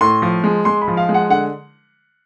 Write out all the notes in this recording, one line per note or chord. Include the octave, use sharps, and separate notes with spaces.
A2 C6
F3
G#3
G#3 C6
B5
F3
F5
G#3
F#5
D3 F#5